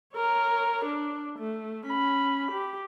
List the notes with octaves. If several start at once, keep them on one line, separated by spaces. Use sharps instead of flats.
A#4 C#5
D4
A3
C#4 B5
G4